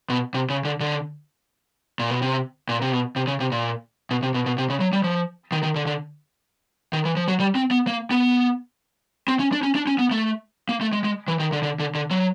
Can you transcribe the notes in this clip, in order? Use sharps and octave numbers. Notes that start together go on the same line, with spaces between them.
B2
C3
C#3
D3
D3
A#2
B2
C3
A#2
C3
B2
C3
C#3
C3
A#2
B2
C3
B2
B2
C3
C#3
F#3
G3
F3
D#3
D#3
D3
D3
D#3
E3
F3
F#3
G3
C4
B3
A#3
B3
C4
C#4
D4
C#4
D4
C#4
B3
A3
A#3
A3
G#3
G#3
E3
D#3
D3
D3
D3
D3
F#3